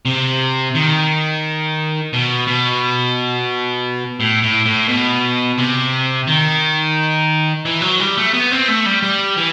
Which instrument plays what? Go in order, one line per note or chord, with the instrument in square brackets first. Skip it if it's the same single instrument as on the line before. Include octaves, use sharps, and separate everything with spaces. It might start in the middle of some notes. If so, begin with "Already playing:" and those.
[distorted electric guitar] C3
D#3
B2
B2
A2
A2
A2
B2
C3
D#3
E3
F#3
G3
A3
B3
C4
A3
G3
G3
E3